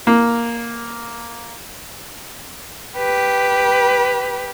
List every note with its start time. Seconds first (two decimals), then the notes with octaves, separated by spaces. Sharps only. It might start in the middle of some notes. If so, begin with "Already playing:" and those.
0.07 A#3
2.97 G4 B4